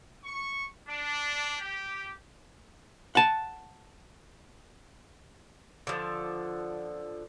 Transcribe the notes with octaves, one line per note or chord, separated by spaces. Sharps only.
C#6
D4
G4
F#5 A5
D3 F3